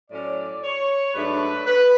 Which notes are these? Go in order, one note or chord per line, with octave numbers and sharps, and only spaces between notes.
A2 F#3 C#4 D5
C#5
G#2 F#3 A3 D4 B4
B4